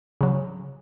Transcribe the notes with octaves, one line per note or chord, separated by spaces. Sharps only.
C#3 F#3